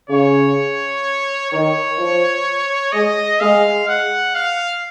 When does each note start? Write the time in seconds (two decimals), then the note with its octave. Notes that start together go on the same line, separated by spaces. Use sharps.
0.09 C#3 C#5
1.51 D#3 C#5
1.98 F3
2.93 G#3 D#5
3.40 G#3 F5
3.88 F#5
4.35 F5